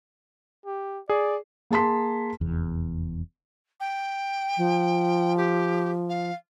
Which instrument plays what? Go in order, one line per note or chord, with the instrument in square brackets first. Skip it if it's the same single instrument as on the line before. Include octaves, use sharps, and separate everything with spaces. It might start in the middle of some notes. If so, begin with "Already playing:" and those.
[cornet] G4
[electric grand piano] G#4 [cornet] D5
[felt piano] A#3 G#4 A5 C6 B6
[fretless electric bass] F1 E2
[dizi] G5
[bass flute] F3
[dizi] G4
F5